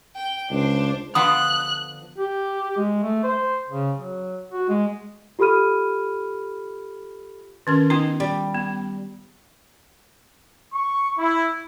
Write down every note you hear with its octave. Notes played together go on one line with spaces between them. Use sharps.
G5
C#2 D4 C5
D3 F3 B3 D#6 F#6
G4
G#3
A3
C5
C#3
F#3
F#4
G#3
F4 G4 A4 B5 F6 D#7
D#3 C#4 A#4
B3 D#4 F4
G3
B3
C#6
E4